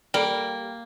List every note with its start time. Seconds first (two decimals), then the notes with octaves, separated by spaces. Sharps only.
0.14 G3 A#3